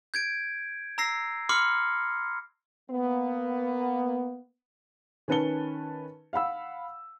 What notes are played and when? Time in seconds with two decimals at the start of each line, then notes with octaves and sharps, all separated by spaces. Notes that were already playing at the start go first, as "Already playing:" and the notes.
0.14 G6 G#6 D7
0.98 A#5 E6 A#6 C7
1.49 B5 C6 D6 F6 C7 C#7
2.91 A#3 B3
5.28 D#3 C#4 B4 A5 C#7 G7
6.33 F5 F#5 B5 E6